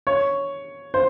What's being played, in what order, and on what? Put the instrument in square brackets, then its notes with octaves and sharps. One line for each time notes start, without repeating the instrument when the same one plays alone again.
[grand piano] C#5
C5